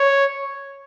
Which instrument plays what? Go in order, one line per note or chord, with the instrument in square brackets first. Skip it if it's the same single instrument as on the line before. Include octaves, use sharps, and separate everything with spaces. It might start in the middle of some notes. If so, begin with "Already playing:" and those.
Already playing: [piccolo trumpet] C#5